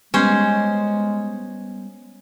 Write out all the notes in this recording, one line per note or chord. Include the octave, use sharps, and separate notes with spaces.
G3 G#3 B3 C#4 C5